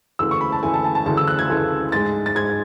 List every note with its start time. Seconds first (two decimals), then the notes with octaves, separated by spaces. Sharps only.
0.19 D2 C#3 E3 A3 E6
0.31 C#6
0.41 B5
0.52 A5
0.63 D2 C#3 E3 A3 G#5
0.74 A5
0.84 A5
0.95 A5
1.06 D2 C#3 E3 A3 A5
1.17 E6
1.28 F#6
1.39 G#6
1.49 D2 C#3 E3 A3
1.92 G#2 G#3 A6
2.26 A6
2.35 G#2 G#3 G#6